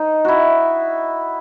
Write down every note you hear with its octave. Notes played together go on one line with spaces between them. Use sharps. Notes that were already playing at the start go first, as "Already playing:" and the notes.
Already playing: D#4
E4 F#4